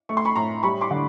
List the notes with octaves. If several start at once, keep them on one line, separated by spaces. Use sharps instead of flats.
A3 C#6
C6
B5 C#6
A2 A#5 C6
G3 B5 C#6
C6 D6
D3